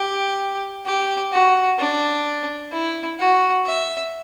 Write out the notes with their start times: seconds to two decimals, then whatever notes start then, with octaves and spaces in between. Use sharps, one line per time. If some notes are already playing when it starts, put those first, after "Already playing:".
Already playing: G4
0.86 G4
1.32 F#4
1.79 D4
2.72 E4
3.19 F#4
3.66 E5